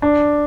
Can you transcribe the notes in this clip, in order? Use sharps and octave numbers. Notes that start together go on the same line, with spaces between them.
D4